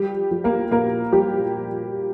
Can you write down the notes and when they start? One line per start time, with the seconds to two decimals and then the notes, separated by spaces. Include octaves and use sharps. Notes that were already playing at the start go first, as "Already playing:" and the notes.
Already playing: F3 G3 G4
0.31 F3
0.44 A#3 A#4
0.71 A#2 A#3 A#4
1.12 F3 G3 G4